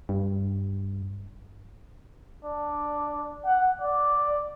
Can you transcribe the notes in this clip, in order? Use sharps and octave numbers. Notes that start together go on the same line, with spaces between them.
G2
D4
F#5
D5